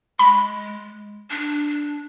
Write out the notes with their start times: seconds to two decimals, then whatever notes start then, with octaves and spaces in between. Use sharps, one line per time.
0.19 G#3 B5
1.31 D4